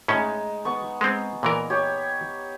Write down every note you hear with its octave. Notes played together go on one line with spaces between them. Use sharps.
A2 G#3 C#4 D#4
B3 C#6
G#3 C4
A#2 E3 A#4
G4 C#5